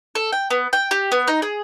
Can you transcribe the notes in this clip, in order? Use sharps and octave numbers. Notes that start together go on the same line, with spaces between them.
A4
G5
B3
G5
G4
B3
D#4
G#4